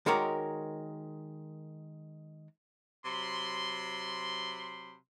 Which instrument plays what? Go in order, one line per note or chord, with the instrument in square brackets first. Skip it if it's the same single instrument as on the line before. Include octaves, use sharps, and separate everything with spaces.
[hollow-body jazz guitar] D#3 G#3 F#4 A#4 C#5 D5
[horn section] C3 F#3 B5 C6